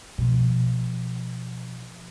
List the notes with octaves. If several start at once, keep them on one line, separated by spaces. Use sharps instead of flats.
B2 F3